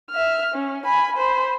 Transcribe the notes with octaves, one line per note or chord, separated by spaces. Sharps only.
E5 F6
C#4
G#5 B5
C5 B5